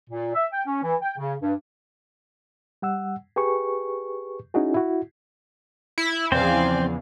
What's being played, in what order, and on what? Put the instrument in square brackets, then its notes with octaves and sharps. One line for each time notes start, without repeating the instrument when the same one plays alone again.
[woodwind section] A#2
E5
G5
C#4
E3
G5
C#3
G2
[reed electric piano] G3 F#5 E6
G4 G#4 B4 C#6
C#4 D#4 E4 F#4 G#4
E4 F#4
[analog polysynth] E4
[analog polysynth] E2 [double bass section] C#3 F3 [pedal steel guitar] C4 C5 [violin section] D5 F5 G#5